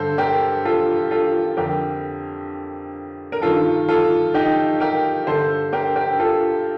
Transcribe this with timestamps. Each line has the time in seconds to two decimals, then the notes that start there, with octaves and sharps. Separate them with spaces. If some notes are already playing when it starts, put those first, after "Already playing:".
Already playing: G2 D3 A4 C5
0.18 G4 A#4
0.65 F4 A4
1.11 F4 A4
1.57 F2 D3 G4 A#4
3.32 A#4
3.42 G2 D#3 F4 A4
3.88 F4 A4
4.34 D#4 G4
4.80 G4 A#4
5.27 G2 D3 A4 C5
5.73 G4 A#4
5.96 G4 A#4
6.19 F4 A4